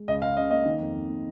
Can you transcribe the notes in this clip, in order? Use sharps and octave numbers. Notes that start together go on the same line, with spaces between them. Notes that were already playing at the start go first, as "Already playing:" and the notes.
Already playing: G#3
C#2 D#5
C#2 F5
C#3 D#5
A#3 D#5
D#3
F2
F2
A#3